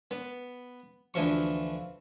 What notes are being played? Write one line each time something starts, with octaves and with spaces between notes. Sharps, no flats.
B3
D2 E3 F3 C#6